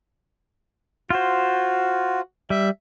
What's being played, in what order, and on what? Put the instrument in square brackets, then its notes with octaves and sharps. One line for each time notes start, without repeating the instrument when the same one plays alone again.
[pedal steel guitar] F4 C5 [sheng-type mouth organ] F#4
[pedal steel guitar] G3 [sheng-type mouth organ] E5